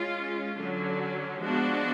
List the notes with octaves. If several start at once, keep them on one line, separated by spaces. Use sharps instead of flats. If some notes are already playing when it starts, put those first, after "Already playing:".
Already playing: G#3 C#4 F4
D3 F#3 C#4
F3 G#3 B3 D4 F#4